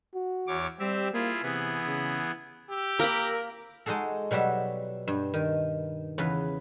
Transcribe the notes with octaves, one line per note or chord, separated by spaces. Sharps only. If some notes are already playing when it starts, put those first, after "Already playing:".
F#4
E2 C#5 D6
G3 C4 G4 E5
A#3 E4 F4 G#4
C3 E3 B3 G#4
C#3
G4 E6
A#3 A#4 B5
G#3 D#4 F#4 G#4 A4
B2 F#3 G3 F#4 E5
G2
D#3
E2 C#3 B4